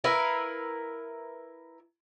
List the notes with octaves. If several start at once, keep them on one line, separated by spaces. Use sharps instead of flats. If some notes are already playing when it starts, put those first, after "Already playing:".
E4 A#4 B4 F5